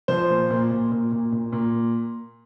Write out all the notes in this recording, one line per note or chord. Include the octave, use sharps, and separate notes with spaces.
F3 C5
A#2
A#2
A#2
A#2
A#2
A#2
A#2